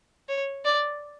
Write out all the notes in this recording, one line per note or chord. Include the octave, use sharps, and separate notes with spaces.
C#5
D5